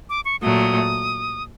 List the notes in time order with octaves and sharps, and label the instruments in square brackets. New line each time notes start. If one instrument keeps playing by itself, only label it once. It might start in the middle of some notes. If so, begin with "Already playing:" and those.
[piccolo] D6
C#6
[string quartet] A#2 F#3 A3 [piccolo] D#6